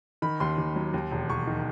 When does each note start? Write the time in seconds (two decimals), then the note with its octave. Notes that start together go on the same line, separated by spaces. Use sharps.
0.22 D#3 B5
0.40 D#2 C6
0.58 D#2
0.76 F#3
0.94 D#2
1.11 E1
1.29 E1 C#6
1.47 D#3